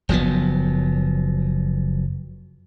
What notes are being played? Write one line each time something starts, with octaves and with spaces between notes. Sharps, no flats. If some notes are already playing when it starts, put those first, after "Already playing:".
F#1 F3 F#3 B3